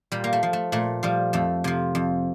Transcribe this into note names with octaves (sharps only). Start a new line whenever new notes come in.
A#2 G3
A#3
A3
F3
A3
A#2 A3
F3 G3
F2 A3
C3 F3
F2